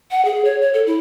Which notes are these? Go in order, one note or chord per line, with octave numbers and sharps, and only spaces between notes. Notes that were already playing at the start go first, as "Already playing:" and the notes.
F#5
G#4
C#5
C#5
A4
E4